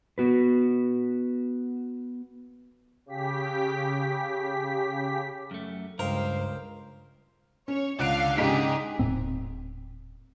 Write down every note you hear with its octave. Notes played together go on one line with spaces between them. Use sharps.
B3 F#4 B4
C#3 G4 B6
F#2 A3
C#2 G2 A#4 C5 F5 G5 A#5
C#4 C#5
C#2 D4 F5 F#5 F#6 D7
G#2 C#3 D#4 G4 G#4 B6
D#1 A2 C4